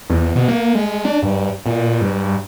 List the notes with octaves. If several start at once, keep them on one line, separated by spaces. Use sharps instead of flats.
E2
B2
A#3
G#3
D4
G2
A#2
G2